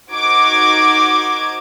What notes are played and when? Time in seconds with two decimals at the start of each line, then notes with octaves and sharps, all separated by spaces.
0.11 D#4 F#4 A#4 C5 D6 G#6